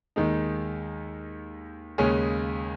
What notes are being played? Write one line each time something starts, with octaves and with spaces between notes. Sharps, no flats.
D#2 D#3 G#3 D#4
D#2 C#3 G#3 C#4 G#4